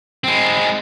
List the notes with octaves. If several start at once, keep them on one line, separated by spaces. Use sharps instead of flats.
G#3 C4